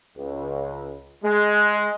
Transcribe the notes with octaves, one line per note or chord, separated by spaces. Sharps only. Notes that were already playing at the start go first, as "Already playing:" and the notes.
C#2
G#3